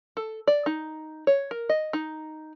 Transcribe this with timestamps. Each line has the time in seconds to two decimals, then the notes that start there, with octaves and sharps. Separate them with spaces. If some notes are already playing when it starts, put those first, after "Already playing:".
0.17 A4
0.47 D5
0.66 D#4
1.27 C#5
1.51 A#4
1.69 D#5
1.93 D#4